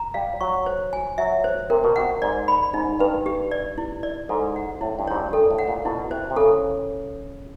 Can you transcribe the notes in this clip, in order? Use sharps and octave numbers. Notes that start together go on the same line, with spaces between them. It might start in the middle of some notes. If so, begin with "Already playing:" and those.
Already playing: A#5
G3 F5
F#3 C#6
C5
G#5
F#3 E5
C5
C3 A#4
B2
C3 F#5
G#2 D5
B5
G#2 D#4
G2 B4
G4
D5
E4
D5
G#2 A4
F#5
A2 E4
G2
G#2 C#5
G2
G2 A4
A2
F#5
A#2
B2 E4
C3 C5
C3
C#3 A4